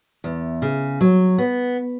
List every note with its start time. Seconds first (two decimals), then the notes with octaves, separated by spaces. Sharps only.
0.24 E2
0.62 C#3
1.01 F#3
1.38 B3